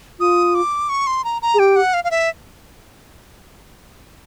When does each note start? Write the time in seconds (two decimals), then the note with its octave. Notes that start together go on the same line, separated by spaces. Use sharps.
0.20 F4 D#6
0.55 D6
0.89 C#6
1.07 C6
1.24 A#5
1.42 A#5
1.54 G#4
1.59 G4 G5
1.76 F#5
1.94 F5
2.04 F5
2.11 E5